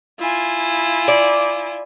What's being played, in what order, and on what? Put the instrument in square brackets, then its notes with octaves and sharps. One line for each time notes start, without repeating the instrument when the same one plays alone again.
[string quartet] E4 F4 G#5
[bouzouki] D5